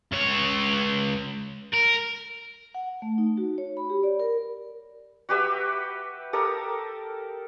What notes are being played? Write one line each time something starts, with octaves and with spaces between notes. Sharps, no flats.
C#2 C#5
A#4
F#5
F#5
A3
D#4
F#4
C#5
B5
G4
D5
A#4
F#4 G4 B4 E5
G4 A4 A#4 D#6